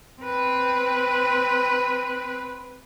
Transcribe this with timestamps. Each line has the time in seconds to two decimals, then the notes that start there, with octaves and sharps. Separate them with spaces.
0.22 C4 B4